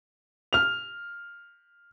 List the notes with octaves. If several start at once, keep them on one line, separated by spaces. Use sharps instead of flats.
F6 F7